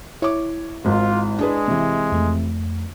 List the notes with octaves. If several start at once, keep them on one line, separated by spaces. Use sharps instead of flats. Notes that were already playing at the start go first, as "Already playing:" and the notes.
E4 C#5 D6
G#1 G#2 F4
G#3 D4 G#4 B4
C3 E3
F2 A3